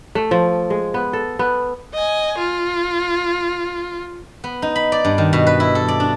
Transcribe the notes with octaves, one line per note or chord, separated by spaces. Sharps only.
A3
F3
G#3
B3
A4
B3
D#5 G#5
F4
B3
D#4
B5
D5
G2
D#3
B2
B4
E4
A4
D5
D4